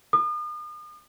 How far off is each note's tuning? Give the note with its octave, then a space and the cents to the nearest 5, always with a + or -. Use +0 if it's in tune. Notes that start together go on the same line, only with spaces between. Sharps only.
D#6 -40